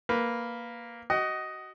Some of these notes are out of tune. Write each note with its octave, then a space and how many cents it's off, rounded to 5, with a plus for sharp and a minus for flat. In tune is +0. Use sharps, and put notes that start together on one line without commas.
A#3 +0 B4 +0
F#4 +20 D#5 +5 F#5 +30